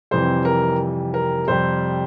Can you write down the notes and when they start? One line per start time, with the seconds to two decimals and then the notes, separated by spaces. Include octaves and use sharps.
0.11 F2 C3 E3 G3 C5
0.45 A#4
1.14 A#4
1.48 F2 C3 G3 C5